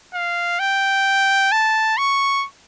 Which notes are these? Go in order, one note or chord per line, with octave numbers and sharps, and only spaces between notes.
F5
G5
A5
C#6